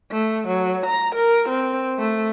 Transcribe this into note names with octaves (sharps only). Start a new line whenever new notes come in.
A3
F#3
A#5
A#4
C4
A3